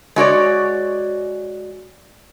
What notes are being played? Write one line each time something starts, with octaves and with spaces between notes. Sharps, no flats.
G#3 F#4 C#5 D5